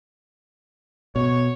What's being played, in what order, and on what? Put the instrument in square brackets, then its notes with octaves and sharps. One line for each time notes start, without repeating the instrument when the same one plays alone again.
[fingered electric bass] B2 [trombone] C#5